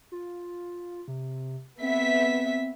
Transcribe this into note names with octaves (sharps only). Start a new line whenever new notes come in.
F4
C3
B3 C4 E5 B6